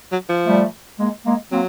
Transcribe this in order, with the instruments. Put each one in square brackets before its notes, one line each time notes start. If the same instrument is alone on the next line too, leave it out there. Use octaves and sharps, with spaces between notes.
[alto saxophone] F#3
F3
[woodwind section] G3 A3
G#3 A#3
G#3 A#3
[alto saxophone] F#3 [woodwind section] A#3 C4